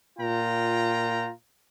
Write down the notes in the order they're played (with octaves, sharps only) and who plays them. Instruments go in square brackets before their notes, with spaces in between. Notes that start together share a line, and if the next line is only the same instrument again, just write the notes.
[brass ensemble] A#2 F4 G5 A#5